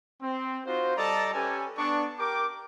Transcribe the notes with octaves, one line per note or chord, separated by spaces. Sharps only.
C4
D#4 F4 F#4 C5
G3 A4 D5 D#5 A5 A#5
C#4 G4 A4 B4 G#5
B3 D4 C#6
G4 A#4 G5 D6